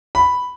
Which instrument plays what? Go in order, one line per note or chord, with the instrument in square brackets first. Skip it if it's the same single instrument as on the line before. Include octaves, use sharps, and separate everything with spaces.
[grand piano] B5